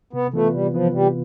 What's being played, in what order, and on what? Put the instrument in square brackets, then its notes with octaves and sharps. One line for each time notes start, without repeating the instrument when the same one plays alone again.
[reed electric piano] C3 [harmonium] B3
[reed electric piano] E3 B3 F4 B4 [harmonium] A3
[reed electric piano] C3 [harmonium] G3
[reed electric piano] E3 B3 F4 B4 [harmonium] F3
[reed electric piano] C3 [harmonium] G3